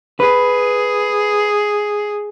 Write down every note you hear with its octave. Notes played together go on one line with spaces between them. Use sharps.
G#4 B4